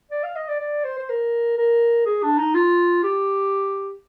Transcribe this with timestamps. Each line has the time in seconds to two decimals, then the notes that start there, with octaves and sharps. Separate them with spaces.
0.11 D5
0.23 F5
0.36 D#5
0.48 D5
0.59 D5
0.85 C5
0.99 C5
1.09 A#4
1.57 A#4
2.06 G#4
2.23 D4
2.38 D#4
2.55 F4
3.03 G4